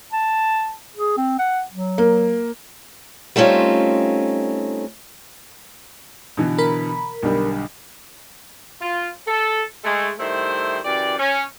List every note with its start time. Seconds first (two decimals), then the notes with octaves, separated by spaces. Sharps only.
0.13 A5
0.96 G#4
1.18 C4
1.39 F#5
1.73 F#3
1.98 A#3
3.36 G3 A3 C4 C#4 D#4 F4
6.37 B2 D3 E3
6.58 A#4 B5
7.23 B1 D3 G3
8.81 F4
9.27 A4
9.84 G#3 A3
10.19 D#3 G3 A3 E4 C5
10.84 F#2 E3 G4 D5
11.19 C#4